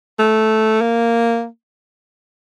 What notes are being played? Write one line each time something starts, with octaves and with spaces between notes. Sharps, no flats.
A3
A#3